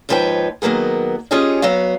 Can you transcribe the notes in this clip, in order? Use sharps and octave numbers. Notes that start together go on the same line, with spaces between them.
D#2 G#2 F3 B4 C#5 G5
D#3 F#3 A#3 B3 G#4
C#4 F4 G4 G#4 C#5 D#5
F#3 B3 F#4 F5